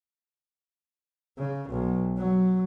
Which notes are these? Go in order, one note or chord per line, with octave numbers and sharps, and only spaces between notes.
C#3
B1
F#3